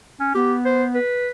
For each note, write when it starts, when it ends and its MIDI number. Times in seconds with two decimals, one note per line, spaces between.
0.20 0.30 61
0.35 0.99 59
0.35 0.53 67
0.65 0.84 72
0.94 1.30 71